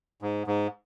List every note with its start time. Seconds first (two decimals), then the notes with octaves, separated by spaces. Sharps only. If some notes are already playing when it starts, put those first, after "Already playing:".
0.22 G#2
0.47 G#2